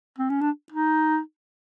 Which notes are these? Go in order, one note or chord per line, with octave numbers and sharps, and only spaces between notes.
C4
C#4
D4
D#4